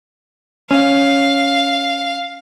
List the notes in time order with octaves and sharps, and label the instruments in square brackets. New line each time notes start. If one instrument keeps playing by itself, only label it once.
[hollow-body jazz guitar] C#4 [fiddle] F5